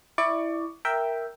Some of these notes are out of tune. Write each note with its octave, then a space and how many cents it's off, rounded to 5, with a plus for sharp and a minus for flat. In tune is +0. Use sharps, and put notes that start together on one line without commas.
E4 +0 D5 +25 C#6 +25
A#4 +0 E5 +0 G5 +0